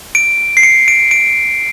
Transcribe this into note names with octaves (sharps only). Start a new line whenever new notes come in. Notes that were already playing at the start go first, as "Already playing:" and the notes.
D7
C7
C#7
D7
D7